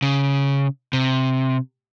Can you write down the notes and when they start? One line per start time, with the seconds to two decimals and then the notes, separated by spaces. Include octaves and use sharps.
0.02 C#3
0.93 C3